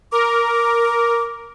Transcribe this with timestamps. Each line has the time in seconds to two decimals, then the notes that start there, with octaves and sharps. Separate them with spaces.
0.12 A#4 D6